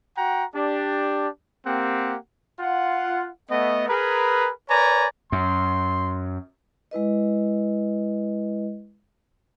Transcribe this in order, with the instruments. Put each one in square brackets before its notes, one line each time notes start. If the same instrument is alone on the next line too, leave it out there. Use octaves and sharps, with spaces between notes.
[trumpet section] F#4 F#5 G5 A#5
D4 G4
A#3 C4 G4 F#5
F4 F#5
A3 B3 D#5
G#4 A#4 B4
A#4 B4 C#5 D5 G#5 A#5
[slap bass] F#2 [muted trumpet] C6
[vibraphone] G#3 E4 B4 D#5